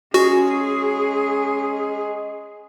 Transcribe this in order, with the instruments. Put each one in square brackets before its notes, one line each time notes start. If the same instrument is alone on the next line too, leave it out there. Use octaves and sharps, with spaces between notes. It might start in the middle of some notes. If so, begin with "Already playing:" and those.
[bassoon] G#3 [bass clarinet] C#4 [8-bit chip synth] F#4 [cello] G#4